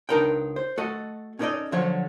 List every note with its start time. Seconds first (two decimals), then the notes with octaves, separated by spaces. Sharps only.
0.09 C#2 D4 D#4 A#4 B4 G5
0.56 C5
0.77 A3 F#4 A4 D#5
1.39 C#4 D#4 A4 A#4 D5 D#5
1.72 D3 F3 F#3 C5 C#5